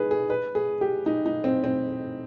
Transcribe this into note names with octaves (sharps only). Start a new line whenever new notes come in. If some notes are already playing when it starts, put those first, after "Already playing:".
Already playing: D#4 G#4 B4
G#4
B4
G#4
G4
D#4
D#4
C4
C4